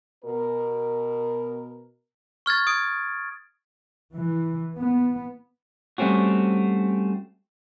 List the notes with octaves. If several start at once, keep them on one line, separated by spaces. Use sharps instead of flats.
B2 A#4
C#6 F6 G#6 A6
D#6 G#6 D7
E3
B3
G3 A3 C4 C#4 F#4